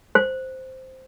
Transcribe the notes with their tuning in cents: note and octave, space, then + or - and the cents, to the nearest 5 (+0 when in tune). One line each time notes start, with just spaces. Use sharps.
C5 -5